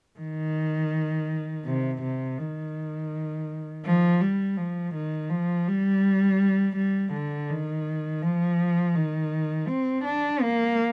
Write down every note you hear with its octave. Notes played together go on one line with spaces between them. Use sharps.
D#3
C3
C3
D#3
F3
G3
F3
D#3
F3
G3
G3
D3
D#3
F3
D#3
C4
D4
A#3